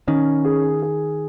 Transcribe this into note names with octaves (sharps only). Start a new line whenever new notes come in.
D#3 C#4
G#4
G#4